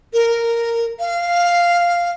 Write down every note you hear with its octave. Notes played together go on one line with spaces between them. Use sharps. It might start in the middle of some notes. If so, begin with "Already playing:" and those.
A#4
F5